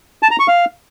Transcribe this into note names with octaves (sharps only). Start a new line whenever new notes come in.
A5
A#5
C#6
F5